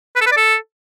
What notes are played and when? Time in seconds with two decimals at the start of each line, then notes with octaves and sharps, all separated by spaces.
0.16 B4
0.21 A4
0.26 B4
0.32 D5
0.37 A4